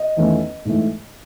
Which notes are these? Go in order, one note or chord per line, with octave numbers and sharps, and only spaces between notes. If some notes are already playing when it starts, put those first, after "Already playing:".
Already playing: D#5
E2 D#3 A3 C#4
G#2 E3 A3